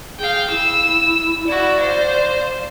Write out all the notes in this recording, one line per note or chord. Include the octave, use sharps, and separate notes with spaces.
G#4 F5 G5
E4 E6
E4 F#4 D5
C5 F5